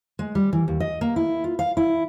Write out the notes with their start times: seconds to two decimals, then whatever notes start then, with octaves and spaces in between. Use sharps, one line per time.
0.19 G#3
0.35 G3
0.53 E3
0.68 D#2
0.80 D#5
1.01 A#3
1.16 E4
1.44 F4
1.59 F5
1.77 E4